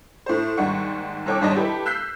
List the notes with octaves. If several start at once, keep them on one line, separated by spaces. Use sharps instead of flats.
A2 C5
D#2 G#2 G3 F#5 C#6
C2 A4 C#5 G5 D6
G#1 G#2 G3 C#5 D#5 A5
E4 G4 A4 B4
E6 F#6 G6 B6 C7